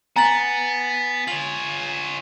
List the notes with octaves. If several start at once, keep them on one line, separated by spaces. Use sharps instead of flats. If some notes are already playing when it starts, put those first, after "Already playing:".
B3 G#5 A#5 A6 F#7
F4 C#5 F#7